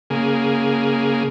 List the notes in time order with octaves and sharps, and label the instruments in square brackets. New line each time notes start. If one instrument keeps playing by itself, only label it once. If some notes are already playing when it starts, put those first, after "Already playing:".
[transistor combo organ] C#3 A#3 G#4